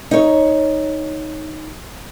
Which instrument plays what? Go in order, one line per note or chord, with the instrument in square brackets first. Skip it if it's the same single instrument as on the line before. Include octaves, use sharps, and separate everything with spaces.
[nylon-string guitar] D#4 C#5